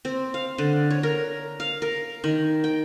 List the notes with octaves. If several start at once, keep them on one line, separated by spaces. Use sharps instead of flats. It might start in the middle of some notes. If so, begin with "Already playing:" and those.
C4
F5
D3
C#5
A#4
F5
A#4
D#3
G5